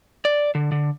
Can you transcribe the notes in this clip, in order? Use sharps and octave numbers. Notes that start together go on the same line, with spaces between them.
D5
D3
D3